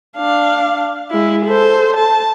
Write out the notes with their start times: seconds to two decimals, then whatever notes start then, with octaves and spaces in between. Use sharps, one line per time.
0.17 D4 F5
1.11 G#3 E4
1.46 A4 C5
1.96 A5